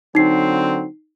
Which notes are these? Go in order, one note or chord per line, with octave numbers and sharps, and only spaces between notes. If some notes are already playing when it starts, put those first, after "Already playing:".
D3 F#3 C4 D#4 C7